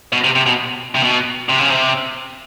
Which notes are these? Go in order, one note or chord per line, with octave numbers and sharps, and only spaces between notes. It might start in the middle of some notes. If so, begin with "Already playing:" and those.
B2
C3
C3
B2
C3
B2
C3
C#3
C3